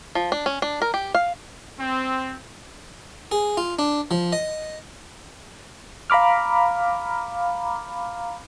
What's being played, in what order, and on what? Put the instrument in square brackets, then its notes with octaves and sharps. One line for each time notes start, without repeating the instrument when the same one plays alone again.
[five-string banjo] F3
D4
C#4
D4
A#4
G4
F5
[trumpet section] C4
[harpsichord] G#4
F4
D4
F3
D#5
[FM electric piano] F5 A#5 B5 D6 F6